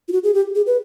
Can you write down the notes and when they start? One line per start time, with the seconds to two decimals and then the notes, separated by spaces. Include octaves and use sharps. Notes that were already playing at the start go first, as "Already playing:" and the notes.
0.08 F4
0.12 F#4
0.23 G#4
0.34 G4
0.55 G#4
0.66 B4